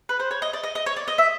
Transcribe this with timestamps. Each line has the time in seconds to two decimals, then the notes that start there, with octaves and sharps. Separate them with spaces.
0.09 B4
0.20 C5
0.31 C#5
0.42 D#5
0.53 D5
0.64 D#5
0.75 D#5
0.86 C#5
0.96 D5
1.08 D#5
1.18 E5